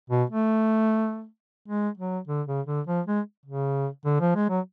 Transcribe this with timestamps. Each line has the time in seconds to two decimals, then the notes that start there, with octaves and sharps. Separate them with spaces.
0.10 B2
0.30 A3
1.68 G#3
1.98 F#3
2.28 D3
2.47 C#3
2.67 D3
2.87 F3
3.06 G#3
3.46 C#3
4.05 D3
4.20 F3
4.35 G#3
4.50 F#3